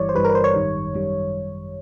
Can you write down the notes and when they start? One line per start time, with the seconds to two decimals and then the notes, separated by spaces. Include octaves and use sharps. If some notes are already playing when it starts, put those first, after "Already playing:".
Already playing: G1 G2 E3 G3 C#5 D5
0.09 C5
0.14 G1 G2 E3 G3 B4
0.25 A#4
0.30 B4
0.35 C5
0.44 C#5
0.54 G#1 F#2 D#3 G3
0.93 G#1 F#2 D#3 G3